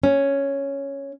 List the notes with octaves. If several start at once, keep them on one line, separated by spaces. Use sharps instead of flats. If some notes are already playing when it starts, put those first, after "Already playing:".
C#4